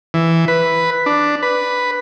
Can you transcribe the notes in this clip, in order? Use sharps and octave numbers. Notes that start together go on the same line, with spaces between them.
E3
B4
D4
B4